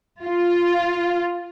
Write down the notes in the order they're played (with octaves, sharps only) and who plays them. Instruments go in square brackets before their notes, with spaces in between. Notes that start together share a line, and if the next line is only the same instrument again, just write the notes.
[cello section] F4